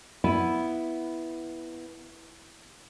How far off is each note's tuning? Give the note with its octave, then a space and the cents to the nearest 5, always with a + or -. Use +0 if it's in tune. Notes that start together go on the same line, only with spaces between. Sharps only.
B3 +0 E4 +0